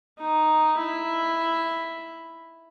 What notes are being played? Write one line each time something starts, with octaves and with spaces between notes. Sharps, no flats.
D#4
E4